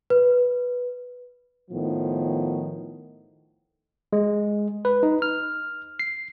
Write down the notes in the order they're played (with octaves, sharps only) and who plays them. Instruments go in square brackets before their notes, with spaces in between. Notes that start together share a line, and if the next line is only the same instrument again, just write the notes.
[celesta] B4
[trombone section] A2 D#3 F3 B3
[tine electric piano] G#3
B4
D#4
F6
C7